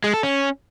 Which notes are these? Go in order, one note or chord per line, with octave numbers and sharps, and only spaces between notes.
G#3
A4
C#4